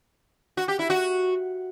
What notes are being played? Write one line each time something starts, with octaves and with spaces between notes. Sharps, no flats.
F#4
G4
E4
F#4